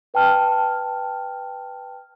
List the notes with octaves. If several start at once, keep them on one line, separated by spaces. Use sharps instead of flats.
B4 G5 A5 F6